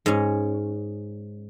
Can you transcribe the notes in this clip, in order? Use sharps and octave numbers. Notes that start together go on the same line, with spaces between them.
G#2 C#4